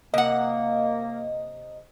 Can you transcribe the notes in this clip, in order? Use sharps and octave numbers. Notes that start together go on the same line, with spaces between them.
C3 A#3 D#5 F#5